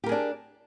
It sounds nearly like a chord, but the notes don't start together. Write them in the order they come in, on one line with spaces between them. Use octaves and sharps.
G4 A#4 G#4 D4